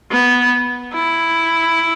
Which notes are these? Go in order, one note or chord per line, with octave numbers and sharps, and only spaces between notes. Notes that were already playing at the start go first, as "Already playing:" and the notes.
B3
E4